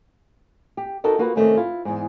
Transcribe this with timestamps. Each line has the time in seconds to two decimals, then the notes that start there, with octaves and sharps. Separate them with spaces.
0.77 G4
1.04 D#4 F#4 A4 A#4 D#5
1.19 A#3 F4 F#4 B4
1.36 C3 D#3 A3 C#4
1.57 E4 F4
1.85 E2 G#2